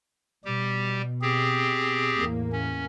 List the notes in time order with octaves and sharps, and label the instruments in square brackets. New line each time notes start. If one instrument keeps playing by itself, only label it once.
[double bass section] B2 [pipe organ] G3 G4
[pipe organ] C4 G4 G#4
[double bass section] E2 A2 A#3
[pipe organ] C#4